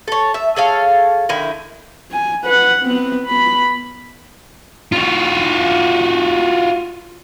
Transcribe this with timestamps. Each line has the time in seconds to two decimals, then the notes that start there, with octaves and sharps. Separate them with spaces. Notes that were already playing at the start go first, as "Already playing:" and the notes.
0.08 A4 C#5
0.34 E5
0.56 G#4 A4 C#5 F5
1.29 D3 D#3 E4
2.12 G#5
2.44 B4 F#5
2.82 B3 C4
3.26 B3 B5
4.92 F4 F#4